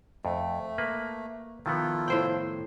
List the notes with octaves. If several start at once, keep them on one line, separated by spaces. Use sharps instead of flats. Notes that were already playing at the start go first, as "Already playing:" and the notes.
F2 A3
A#3 B4
D#3 F3 B3 E4 F4 A4
A2 C5 G5